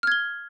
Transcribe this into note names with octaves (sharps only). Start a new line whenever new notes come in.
F6 G#6 G7